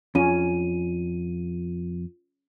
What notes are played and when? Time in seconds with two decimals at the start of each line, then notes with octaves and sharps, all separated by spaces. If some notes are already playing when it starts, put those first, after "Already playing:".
0.15 F2 C#4 F4 D#7